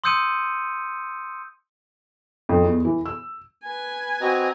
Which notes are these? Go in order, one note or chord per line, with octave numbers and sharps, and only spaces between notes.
C6 D#6 E6 G6 C#7 D#7
F2
E2
E3
E6
B4 G#5
C4 F#4 D#5 A#5